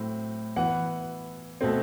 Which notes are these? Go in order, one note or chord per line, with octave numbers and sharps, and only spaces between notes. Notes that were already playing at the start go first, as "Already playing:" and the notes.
Already playing: A2 F#3 C4
E3 B3 F#5
B2 A3 C4